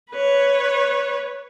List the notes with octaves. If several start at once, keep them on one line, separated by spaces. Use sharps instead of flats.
B4 C#5